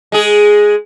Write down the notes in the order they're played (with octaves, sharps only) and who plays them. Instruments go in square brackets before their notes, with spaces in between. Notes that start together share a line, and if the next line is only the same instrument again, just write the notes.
[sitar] G#3 G#4